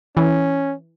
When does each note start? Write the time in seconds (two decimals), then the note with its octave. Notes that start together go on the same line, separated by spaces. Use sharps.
0.17 E3 C#4